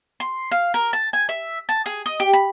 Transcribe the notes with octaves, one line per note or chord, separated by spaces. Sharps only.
C6
F5
A#4
A5
G#5
E5
A5
G#4
D#5
G4
B5